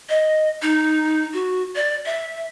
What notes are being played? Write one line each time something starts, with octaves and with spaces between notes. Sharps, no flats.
D#5
D#4
F#4
D5
E5